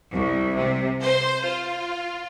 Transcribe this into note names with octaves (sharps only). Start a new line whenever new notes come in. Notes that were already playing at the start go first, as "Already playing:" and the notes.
C2
C3
C5
F4